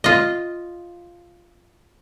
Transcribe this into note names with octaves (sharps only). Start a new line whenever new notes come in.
F4 D#5